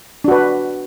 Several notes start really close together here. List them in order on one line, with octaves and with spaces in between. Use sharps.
D4 F#4 B4